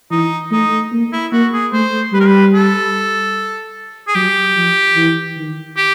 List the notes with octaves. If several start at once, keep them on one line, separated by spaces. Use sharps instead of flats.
E3 D#4
A3 D#4
A#3
E4
A#3 F#4
G#4
A3 C5
G3 B4
A#4
B4
A4
G#4
F#3 G4
F3
E3
D#3
G4